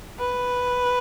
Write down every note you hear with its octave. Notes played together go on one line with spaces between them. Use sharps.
B4